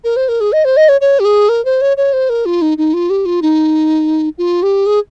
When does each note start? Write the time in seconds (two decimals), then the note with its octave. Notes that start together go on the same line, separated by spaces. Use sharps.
0.04 A#4
0.16 C5
0.29 A#4
0.41 G#4
0.53 D#5
0.65 C5
0.77 D#5
0.89 C#5
1.01 C#5
1.20 G4
1.25 G#4
1.49 A#4
1.65 C5
1.81 C#5
1.97 C#5
2.13 C5
2.30 A#4
2.46 F4
2.62 D#4
2.78 D#4
2.94 F4
3.10 G4
3.26 F4
3.42 D#4
4.38 F4
4.63 G4
4.86 G#4